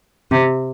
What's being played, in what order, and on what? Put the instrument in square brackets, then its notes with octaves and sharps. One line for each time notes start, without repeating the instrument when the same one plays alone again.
[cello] C3